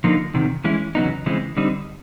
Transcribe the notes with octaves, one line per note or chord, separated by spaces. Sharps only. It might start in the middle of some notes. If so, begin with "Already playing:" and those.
D3 F3 A#3 D#4
E2 C3 D#3
E3 G#3 C#4 E4
E2 C#3 F#3 B3 D#4
C#3 E3 G#3 C4
D3 G3 C4 D#4